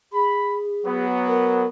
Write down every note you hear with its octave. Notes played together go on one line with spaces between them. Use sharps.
G#4 B5
F#3 B3
A#4